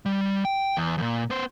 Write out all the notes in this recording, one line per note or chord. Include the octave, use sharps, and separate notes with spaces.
G3
G5
E2
E2 A#2
B3 C5